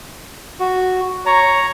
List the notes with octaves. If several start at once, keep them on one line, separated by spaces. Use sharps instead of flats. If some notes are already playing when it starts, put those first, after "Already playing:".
F#4
C#5 A#5